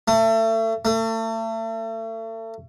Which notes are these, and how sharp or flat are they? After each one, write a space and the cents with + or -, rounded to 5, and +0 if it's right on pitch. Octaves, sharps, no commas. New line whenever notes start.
A3 +30
A3 +35